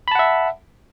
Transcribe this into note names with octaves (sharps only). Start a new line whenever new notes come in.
E5 F#5 A5 B5